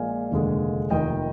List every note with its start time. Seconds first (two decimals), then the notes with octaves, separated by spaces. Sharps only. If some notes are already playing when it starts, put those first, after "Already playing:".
Already playing: A#1 A#2 G#3 F5 G#5
0.31 F1 D#2 D3 G#3
0.90 F1 D#2 D#3 D#5 G5